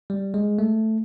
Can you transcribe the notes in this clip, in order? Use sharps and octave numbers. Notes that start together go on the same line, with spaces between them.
G3
G#3
A3